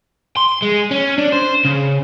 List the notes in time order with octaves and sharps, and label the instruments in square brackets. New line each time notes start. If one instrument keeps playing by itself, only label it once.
[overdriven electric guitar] C6
G#3
C#4
D4
C5
C#3